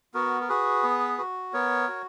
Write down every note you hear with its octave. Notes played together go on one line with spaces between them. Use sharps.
B3 F#4 A#4
A#4
F#4 G#4 B4
B3
F#4
B3 A#4 C#5
F#4